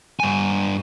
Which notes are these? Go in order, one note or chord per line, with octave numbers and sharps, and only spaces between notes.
G2 G#5